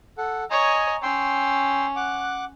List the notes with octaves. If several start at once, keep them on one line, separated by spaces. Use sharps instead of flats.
A4 F#5
C#5 D#5 G#5 A#5
C#4 G5 C6 E6
F#5 D6 F#6